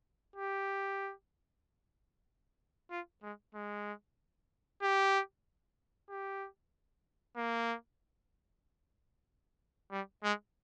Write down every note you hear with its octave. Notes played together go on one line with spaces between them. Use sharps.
G4
F4
G#3
G#3
G4
G4
A#3
G3
G#3